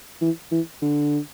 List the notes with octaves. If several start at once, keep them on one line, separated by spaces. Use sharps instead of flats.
E3
E3
D3